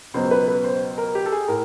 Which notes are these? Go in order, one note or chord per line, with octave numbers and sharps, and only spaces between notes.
C#2 B2 F#3 B3 C5
B4
B4
C5
A#4
G4
A4
G#4
A2 A#4